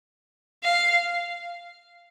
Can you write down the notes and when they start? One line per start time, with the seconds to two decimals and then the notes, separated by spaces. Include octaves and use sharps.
0.63 F5